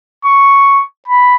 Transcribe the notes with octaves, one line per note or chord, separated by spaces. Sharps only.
C#6
B5